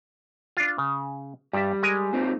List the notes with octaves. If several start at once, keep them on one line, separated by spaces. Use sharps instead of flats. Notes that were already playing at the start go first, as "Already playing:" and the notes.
D4 F4
C#3
G2 G3 D5 E5
G#3 A#4 G#5
A#2 C4 D#4